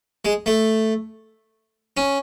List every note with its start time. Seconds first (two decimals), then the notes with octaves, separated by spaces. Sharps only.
0.25 G#3
0.46 A3
1.97 C#4